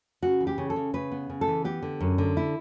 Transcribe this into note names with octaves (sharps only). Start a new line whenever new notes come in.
C#3 F#4
E3
G4
C#3
A4
C#3
C#3 B4
B3
C#3
A4
E3
B3 G4
D3
F#2
D3
E4